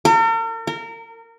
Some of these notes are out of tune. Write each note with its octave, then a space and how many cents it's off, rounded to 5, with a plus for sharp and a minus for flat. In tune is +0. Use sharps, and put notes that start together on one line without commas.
A#4 -45
A#4 -25